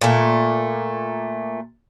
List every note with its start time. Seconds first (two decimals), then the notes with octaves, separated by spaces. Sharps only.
0.01 A#2 A3